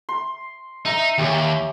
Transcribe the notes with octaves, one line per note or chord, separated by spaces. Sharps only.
C6
D#4 E5 A#5
D#2 G4 C#5 G#5